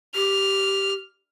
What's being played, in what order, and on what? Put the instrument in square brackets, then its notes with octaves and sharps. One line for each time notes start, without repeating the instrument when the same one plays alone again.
[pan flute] G4 [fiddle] F6